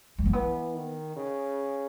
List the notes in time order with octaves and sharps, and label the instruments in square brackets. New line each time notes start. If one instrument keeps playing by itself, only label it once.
[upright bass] A3
A#3
[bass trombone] E3 [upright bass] B3
[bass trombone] D#3
C#3